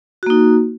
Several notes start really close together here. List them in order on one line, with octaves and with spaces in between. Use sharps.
F#4 A#3 D#4